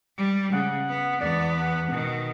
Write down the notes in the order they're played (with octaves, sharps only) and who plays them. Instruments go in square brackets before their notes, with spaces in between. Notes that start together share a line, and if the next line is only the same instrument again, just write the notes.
[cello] G3
[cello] C#3 [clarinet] F#5
[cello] B3
[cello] E2 B3 [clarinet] D5
[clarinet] F#5
[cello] B2 D#3